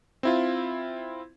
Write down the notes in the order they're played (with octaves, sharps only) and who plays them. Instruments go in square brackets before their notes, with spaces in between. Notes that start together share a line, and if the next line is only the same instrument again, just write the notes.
[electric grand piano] C4 E4 F4